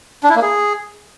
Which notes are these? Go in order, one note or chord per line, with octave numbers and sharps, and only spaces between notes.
D4
E4
A#3
G#4